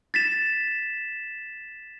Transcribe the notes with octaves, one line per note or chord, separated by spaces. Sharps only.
A6 B6 E7